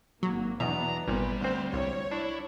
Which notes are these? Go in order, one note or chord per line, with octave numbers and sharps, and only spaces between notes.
G#1 F#3 A#3
E2 B2 F#3 B3 D4 A#5
G#1 A#2 G3 B4
D2 C4 C5
C2 C#5
D4 E4